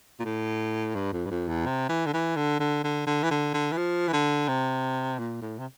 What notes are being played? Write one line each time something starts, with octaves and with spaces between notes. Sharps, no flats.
A#2
A2
G2
F2
G2
F2
E2
C3
E3
D3
E3
D3
D3
D3
D3
E3
D3
D3
E3
F3
E3
D3
C3
A#2
A2
C3